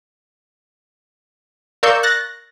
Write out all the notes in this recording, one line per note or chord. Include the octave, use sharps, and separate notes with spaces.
A#4 D5 F5 C#6 E6 G6
F#6 A6 A#6